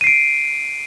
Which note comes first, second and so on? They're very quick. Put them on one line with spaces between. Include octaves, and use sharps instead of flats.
D#7 C7 D7